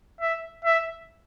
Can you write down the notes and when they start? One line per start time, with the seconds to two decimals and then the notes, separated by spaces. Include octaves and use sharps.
0.21 E5
0.65 E5